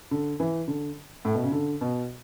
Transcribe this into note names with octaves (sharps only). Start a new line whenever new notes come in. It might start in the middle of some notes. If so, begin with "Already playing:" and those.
D3
E3
D3
A2
B2
C#3
D3
B2